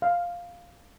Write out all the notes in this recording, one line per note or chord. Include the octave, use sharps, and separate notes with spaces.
F5